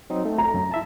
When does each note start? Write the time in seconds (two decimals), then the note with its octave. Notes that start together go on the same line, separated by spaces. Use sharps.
0.10 F#3 C4 D#4
0.25 A3
0.38 A#5
0.54 F#2
0.71 E4 E5 A5